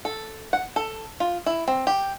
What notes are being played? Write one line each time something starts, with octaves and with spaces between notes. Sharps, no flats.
A4
F#5
A4
F4
E4
C4
G4